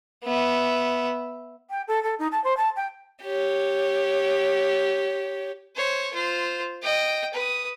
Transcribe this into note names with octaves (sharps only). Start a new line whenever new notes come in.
B3 E5
G5
A4
A4
D#4
A5
C5
A5
G5
G4 C#5
C5 C#5
F4 C5
D#5 G5
B4 D#6